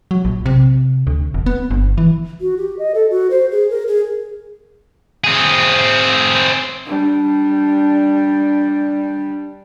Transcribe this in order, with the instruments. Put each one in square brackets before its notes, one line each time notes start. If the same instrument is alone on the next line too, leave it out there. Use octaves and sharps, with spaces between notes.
[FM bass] F#3
A#1
C3
D2
F1
B3
G1
E3
[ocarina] F#4
G4
D#5
A4
F#4
C5
G#4
A#4
G#4
[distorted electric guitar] C4 G#4
[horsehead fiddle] G3 D4